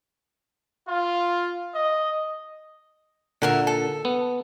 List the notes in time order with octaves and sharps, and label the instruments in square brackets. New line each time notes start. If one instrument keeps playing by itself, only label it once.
[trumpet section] F4
D#5
[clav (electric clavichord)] A#2 D3 [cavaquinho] F#4 A#4 E5
[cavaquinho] A4
[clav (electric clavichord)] B3